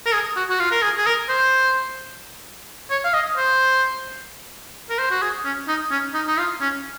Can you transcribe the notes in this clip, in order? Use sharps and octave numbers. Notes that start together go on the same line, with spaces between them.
A#4
G#4
F#4
F#4
F4
A#4
G#4
G#4
A#4
C5
C#5
F5
D#5
C5
A#4
C5
F#4
G#4
C#4
D#4
C#4
D#4
D#4
F4
C#4